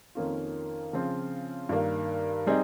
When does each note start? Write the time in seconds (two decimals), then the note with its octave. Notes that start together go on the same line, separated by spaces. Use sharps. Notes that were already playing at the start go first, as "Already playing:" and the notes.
0.15 F2 D#3 A#3 C#4 F4
0.93 C#3 F3 C4 F4
1.69 G2 D#3 A#3
2.47 G3 C4 D#4 G#4